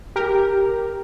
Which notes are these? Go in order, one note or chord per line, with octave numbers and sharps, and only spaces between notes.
G4 A#4